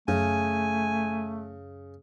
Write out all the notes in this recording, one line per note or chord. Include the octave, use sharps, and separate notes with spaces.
F#2 C#3 A3 G#5